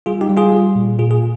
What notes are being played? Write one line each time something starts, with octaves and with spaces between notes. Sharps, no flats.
G3 F4 G#4
D#4 G4
G3
F4 G#4
G3
A#2
A#2 F4 G#4
F4 G#4